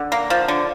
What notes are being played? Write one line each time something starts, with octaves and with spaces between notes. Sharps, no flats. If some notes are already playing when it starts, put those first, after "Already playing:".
Already playing: D3
A#3
F3
D3